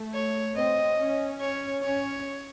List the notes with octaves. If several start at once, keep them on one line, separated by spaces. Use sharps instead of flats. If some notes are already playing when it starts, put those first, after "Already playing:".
Already playing: A3
C#5
C4 D#5
C#4
C#5
C#4 C#5